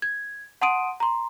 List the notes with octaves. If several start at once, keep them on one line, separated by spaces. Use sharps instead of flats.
G#6
F#5 A5 C6 D#6 D7 D#7
A#5 C6